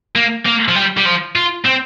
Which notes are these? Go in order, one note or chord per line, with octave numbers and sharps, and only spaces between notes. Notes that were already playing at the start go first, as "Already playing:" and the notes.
A#3
A#3
F3
G3
G3
F3
F4
C4